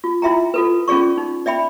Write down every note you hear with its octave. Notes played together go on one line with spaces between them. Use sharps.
F4
E4 F4 E5 G5 A#5
F4 A4 B4
C#4 F4 G#4 D5 C#6
D#4
D5 E5 G5 B5